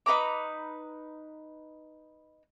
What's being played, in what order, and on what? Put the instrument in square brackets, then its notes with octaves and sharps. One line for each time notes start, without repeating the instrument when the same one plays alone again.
[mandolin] D#4 B4 A#5 D6